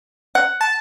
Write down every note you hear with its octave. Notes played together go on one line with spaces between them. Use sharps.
F#5
A5